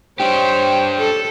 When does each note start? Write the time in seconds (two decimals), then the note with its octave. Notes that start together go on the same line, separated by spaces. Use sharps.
0.20 D4 G4 C5 C#5 G5
0.98 A4